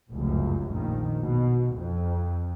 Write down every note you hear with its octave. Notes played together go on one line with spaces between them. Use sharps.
F1 C#2 F#2
A#1 D#3
B2
F2